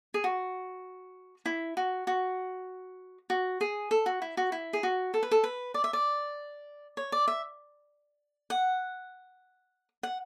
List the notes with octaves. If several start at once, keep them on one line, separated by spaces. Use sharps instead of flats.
G#4
F#4
E4
F#4
F#4
F#4
G#4
A4
F#4
E4
F#4
E4
G#4
F#4
A4
B4
A4
B4
D5
E5
D5
C#5
D5
E5
F#5
F#5